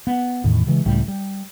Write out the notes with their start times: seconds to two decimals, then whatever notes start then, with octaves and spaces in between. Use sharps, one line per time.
0.07 B3
0.44 E2 A2 D#3
0.67 C#3 E3 G#3
0.86 C#2 A2 G3 A3
1.08 G3